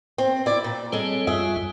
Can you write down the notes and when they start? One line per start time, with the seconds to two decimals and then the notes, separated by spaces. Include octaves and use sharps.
0.18 C4
0.46 E4 D5
0.64 A#2
0.92 G3 G#3 C4 A4 C#5
1.27 F#2 G3 F4 G#4 E5